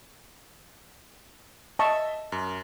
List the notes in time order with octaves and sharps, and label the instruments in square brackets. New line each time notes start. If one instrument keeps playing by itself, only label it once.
[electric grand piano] D#5 E5 [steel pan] A5 C#6
[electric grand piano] F#2